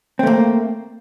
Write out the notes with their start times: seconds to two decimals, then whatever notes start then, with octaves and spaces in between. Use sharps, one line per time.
0.19 C4
0.23 A3
0.27 A#3